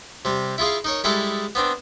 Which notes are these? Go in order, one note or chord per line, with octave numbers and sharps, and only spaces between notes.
C3 G3
E4 F4 G#4 F5
D#4 A#4 C#5
G3 G#3 E4 G#4 A4
B3 C4 D4